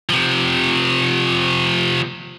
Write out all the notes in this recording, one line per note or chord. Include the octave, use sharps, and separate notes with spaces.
C3 F3